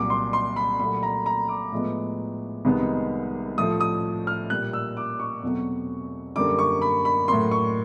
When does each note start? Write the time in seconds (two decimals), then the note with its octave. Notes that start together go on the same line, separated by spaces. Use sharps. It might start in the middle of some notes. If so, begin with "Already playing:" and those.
Already playing: C2 A#2 F#3 D6
0.10 C6
0.33 C6
0.56 B5
0.79 A#2 F#3 A3 B5
1.03 A#5
1.26 A#5
1.49 D6
1.72 A2 F3 G#3 B3
2.65 C2 C3 D#3 G#3 B3
3.58 A2 F3 A3 D#6
3.81 D#6
4.27 F6
4.50 A#2 G3 A#3 F#6
4.73 E6
4.97 D6
5.20 C#6
5.43 E2 B2 F#3 A3 C4
6.36 F#2 D3 G3 A#3 D6
6.59 C#6
6.82 B5
7.05 B5
7.28 A2 F#3 A#3 C6
7.51 C#6